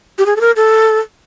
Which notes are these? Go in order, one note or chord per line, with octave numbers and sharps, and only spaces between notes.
G4
G#4
A4
A#4
A4